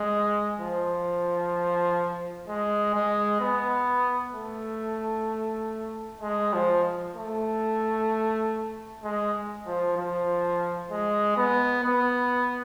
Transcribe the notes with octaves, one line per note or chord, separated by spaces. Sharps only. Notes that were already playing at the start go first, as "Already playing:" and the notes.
Already playing: G#3
F3
G#3
G#3
B3
A3
G#3
F3
A3
G#3
F3
F3
G#3
B3
B3